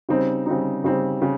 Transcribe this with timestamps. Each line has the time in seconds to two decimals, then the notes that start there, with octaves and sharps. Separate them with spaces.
0.09 C#3 G3 C4 D#4
0.46 C#3 G3 C4 D#4
0.84 C#3 G3 C4 D#4
1.22 C#3